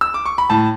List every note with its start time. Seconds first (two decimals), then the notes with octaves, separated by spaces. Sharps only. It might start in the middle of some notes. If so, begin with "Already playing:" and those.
0.01 E6
0.14 D6
0.26 C#6
0.38 B5
0.50 A2 A5